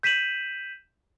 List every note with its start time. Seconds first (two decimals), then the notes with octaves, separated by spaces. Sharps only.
0.03 G6 B6 D#7 E7 F#7